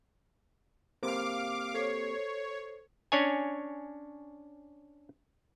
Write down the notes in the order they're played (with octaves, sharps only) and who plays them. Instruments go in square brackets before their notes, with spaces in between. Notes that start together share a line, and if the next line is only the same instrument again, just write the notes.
[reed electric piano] A#3 C4 G4 [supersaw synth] F5 D6
[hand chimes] A4 C5 C7 [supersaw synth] C#5
[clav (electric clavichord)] C#4 D4 C#5 G#5